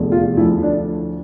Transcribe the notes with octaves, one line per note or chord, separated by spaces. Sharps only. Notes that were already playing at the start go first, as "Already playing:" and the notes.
Already playing: F1 E2 D3 F3
F4
D2 D3 F3 E4
D4